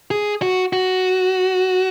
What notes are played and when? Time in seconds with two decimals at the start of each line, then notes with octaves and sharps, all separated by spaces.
0.11 G#4
0.42 F#4
0.73 F#4